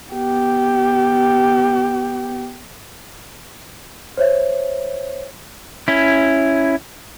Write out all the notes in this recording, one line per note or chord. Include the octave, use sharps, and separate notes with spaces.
B3 G4
C5 C#5 E5
C#4 E4